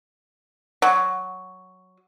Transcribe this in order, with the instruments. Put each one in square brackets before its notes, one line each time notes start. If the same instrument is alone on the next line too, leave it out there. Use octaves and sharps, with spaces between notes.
[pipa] F#3